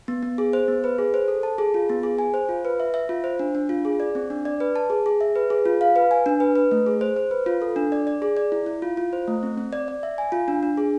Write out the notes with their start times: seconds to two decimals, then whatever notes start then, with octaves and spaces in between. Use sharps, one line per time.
0.08 B3
0.23 B3
0.38 G#4
0.53 C5
0.68 B3
0.84 B4
0.98 G#4
1.14 C5
1.28 A4
1.43 A5
1.58 G#4
1.74 F4
1.89 B3
2.03 G#4
2.18 G#5
2.34 C5
2.49 F4
2.65 B4
2.80 E5
2.94 E5
3.09 F4
3.24 C5
3.39 D4
3.55 D4
3.69 F4
3.85 G#4
4.00 D5
4.15 C4
4.30 D4
4.45 D5
4.60 B4
4.76 A5
4.90 G#4
5.06 G#4
5.21 E5
5.36 B4
5.50 G#4
5.66 F4
5.81 F5
5.96 B4
6.11 G#5
6.26 D4
6.40 B4
6.56 B4
6.71 A3
6.86 G#4
7.01 C5
7.16 C5
7.31 B4
7.46 F4
7.62 A4
7.76 D4
7.92 D5
8.07 D5
8.22 G#4
8.37 D5
8.52 E4
8.66 E4
8.82 F4
8.97 F4
9.13 C5
9.28 A3
9.43 C4
9.57 C4
9.73 D5
9.88 D5
10.03 E5
10.18 G#5
10.32 F4
10.48 D4
10.63 D4
10.77 G#4